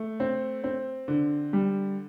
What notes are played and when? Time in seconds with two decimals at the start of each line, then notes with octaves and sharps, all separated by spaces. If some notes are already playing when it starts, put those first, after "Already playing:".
Already playing: A3
0.20 C4
0.64 C4
1.08 D3
1.53 G3